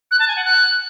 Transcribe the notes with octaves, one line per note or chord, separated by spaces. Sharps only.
F#6
A5
G#5
F#5
F#6